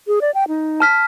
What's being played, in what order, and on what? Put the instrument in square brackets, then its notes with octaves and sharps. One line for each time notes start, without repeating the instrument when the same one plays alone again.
[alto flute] G#4
D5
G5
D#4
[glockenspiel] A5 F6 B6